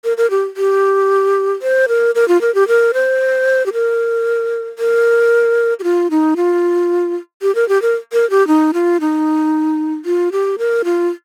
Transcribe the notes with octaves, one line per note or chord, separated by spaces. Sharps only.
A#4
A#4
G4
G4
C5
A#4
A#4
F4
A#4
G4
A#4
C5
G4
A#4
A#4
G4
F4
D#4
F4
G4
A#4
G4
A#4
A#4
G4
D#4
F4
D#4
F4
G4
A#4
F4